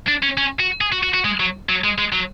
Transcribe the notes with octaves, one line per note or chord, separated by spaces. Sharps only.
D4
C#4
C#4
F#4
G#4
F#4
F#4
F#4
G#3
F#3
F#3
G#3
G#3
F#3